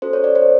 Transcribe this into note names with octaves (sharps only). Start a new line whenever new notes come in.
C#4 F#4 A4 C5
C#5
D5
C5